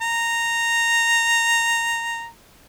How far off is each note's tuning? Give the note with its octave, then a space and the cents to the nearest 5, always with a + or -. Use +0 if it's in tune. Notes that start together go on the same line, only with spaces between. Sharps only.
A#5 -10